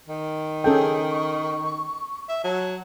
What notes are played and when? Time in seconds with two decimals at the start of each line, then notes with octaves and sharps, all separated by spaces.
0.09 D#3
0.64 C#4 G#4 A4 G5
1.10 C#6
2.29 E5
2.44 F#3 A5